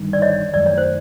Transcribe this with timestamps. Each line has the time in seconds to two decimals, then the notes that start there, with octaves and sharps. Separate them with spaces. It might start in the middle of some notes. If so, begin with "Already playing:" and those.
Already playing: G1 G2 D#3
0.13 D5
0.22 C#5 D#5
0.54 F#2 D#3 F#3 A3 D5
0.66 C#5
0.78 C5